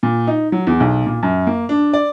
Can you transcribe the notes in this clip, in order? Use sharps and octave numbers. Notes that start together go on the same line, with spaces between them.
A#2
D#4
F#3
E2
B1
A#2
F#2
A#3
D4
D5